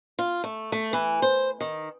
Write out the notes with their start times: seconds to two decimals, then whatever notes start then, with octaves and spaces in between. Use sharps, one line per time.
0.19 F4
0.44 A3
0.72 A3
0.93 E3
1.22 C5
1.61 D#3